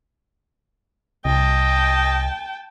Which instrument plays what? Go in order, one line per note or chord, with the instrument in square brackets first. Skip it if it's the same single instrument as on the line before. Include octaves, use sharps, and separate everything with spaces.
[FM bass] C2 [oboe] D#5 [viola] G5 A5